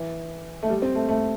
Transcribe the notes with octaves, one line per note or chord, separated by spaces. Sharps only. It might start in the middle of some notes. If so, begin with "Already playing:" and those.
Already playing: E3
A3
G3
C4
A3
A3